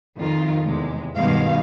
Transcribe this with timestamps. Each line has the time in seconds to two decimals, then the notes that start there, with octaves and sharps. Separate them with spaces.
0.16 F2 D#3 F4
0.64 E2 C3 G#3
1.15 G2 B2 D#3 G#3 F5